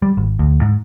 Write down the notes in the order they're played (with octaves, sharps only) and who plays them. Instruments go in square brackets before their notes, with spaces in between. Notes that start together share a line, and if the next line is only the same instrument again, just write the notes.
[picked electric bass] G3
G#1
D2
G#2